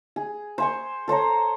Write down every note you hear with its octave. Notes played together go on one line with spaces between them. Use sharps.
G#4
C5 G#5 C#6
A4 C5 C#5 A#5